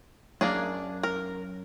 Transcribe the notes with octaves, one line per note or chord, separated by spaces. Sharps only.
F#2 A#3 D4 G#4
A#4